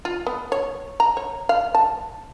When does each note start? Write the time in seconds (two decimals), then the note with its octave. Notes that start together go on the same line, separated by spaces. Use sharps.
0.05 F4
0.27 B3
0.52 C#5
1.00 A#5
1.17 C#5
1.49 F5
1.75 A5